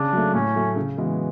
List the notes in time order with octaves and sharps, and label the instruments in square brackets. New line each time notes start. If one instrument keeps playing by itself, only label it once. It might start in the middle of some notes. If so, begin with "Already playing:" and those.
Already playing: [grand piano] C#3 [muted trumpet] D4
[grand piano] F#3 A3
[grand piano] A2 [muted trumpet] C#4
[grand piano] F#3 A3
C#3
E3 G#3 B3 F#4